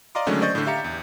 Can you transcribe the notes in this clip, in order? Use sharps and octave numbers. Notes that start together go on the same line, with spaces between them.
D5 D#5 F5 A#5 C6 D6
D3 D#3 F#3 G#3 A3 C#4
C5 D5 D#5 C#6 G6 A6
A2 D3
G4 E5 F5 A#5 C#7
E2